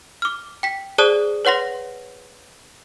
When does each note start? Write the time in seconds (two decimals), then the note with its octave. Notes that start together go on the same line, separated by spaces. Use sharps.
0.22 D6 F6
0.63 G5 B6
0.98 G#4 C5 D5 A5 D#6 F#6
1.45 B4 C#5 F#5 C6 A#6